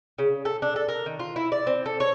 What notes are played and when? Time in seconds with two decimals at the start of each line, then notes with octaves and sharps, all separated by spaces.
0.18 C#3
0.45 A4
0.62 D4
0.76 A4
0.89 A#4
1.06 D#3
1.19 F4
1.36 E4
1.52 D5
1.67 C4
1.86 A4
2.00 C#5